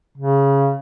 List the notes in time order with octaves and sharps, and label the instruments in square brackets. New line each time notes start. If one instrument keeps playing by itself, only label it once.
[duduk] C#3